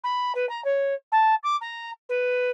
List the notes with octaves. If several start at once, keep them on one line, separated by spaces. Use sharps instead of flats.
B5
B4
A#5
C#5
A5
D6
A#5
B4